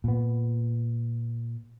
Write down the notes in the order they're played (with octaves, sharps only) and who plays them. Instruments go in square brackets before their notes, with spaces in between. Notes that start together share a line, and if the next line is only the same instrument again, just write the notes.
[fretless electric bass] A#2 B3